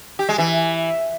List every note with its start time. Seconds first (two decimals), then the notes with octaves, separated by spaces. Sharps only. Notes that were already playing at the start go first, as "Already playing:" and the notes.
0.19 G4
0.29 G#3
0.38 E3